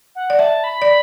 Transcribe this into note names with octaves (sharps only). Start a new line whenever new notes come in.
F#5
D5
E5 A5
B5
D5